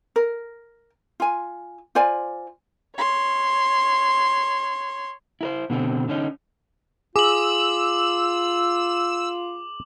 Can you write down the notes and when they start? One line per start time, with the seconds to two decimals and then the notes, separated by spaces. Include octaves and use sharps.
0.16 A#4
1.20 F4 G#5
1.95 F4 C5 D5 G#5
2.96 C#5 C6
5.41 E4 A#4 C5
5.70 B2 D3 C4
6.08 D3 C#4 D#4
7.16 F4 G#4 D6 E6 F#7